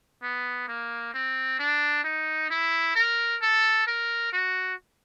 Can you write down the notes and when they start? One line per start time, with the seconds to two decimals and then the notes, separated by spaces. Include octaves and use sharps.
0.22 B3
0.68 A#3
1.14 C4
1.59 D4
2.04 D#4
2.50 E4
2.95 A#4
3.42 A4
3.87 A#4
4.32 F#4